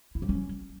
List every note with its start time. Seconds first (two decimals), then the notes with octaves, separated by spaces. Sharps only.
0.15 E4
0.22 G3
0.29 C#4